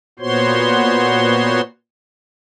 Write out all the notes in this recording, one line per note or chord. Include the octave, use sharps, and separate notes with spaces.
A#2 B3 F#4 C5 C#5 C6